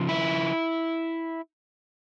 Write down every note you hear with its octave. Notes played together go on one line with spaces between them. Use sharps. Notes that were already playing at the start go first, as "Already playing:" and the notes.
Already playing: C#3 F3
E4